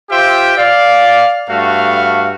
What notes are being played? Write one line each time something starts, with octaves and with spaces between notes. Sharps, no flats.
F4 G4 C5 E5 G5
D5 F5
G2 A3 F#4 F5